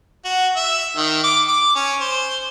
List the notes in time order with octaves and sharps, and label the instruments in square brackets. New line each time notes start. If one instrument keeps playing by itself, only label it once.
[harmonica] F#4
E5
D#3
D6
D6
C#4
C5